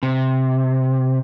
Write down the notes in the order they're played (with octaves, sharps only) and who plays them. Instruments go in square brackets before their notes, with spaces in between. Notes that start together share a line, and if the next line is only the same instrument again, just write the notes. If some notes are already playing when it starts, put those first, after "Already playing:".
[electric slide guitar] C3